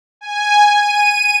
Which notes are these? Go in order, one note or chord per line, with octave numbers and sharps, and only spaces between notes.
G#5
D#7